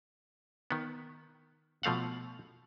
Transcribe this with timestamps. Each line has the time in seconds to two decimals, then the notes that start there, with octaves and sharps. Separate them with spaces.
0.71 D#3 B3
1.83 B2 F3 A3 F5 F#5